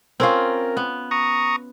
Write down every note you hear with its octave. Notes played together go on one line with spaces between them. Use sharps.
C4 C#4 F4 A#4
B3
A#5 C#6 D#6